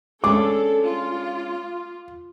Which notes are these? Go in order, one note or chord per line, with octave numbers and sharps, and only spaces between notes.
G#3 C#4 D4 A4 D6
F4